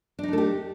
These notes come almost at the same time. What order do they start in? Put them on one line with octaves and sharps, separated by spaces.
D4 D#4 A3 A4 G4